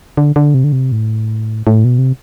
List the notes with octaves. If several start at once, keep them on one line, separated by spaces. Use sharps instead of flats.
D3
D3
C3
D3
C3
A2
A2
B2
C3